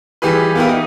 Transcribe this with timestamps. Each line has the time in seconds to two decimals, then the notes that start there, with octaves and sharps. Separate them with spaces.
0.22 E3 G3 G4 G#4 B4
0.55 B3 E4 F4 G4 A#4 B4
0.69 D#4